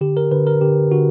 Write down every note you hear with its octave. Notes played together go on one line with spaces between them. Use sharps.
D3 G4
A#4
D3 B4
A#4
D3 G4
D3 F#4